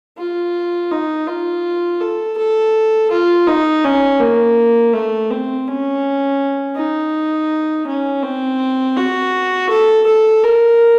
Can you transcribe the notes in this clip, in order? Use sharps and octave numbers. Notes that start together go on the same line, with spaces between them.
F4
D#4
F4
A4
A4
F4
D#4
C#4
A#3
A3
C4
C#4
D#4
C#4
C4
F#4
A4
A4
A#4